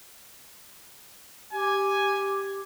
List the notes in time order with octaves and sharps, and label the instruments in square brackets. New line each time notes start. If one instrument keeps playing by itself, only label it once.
[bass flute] G4 [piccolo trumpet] G#5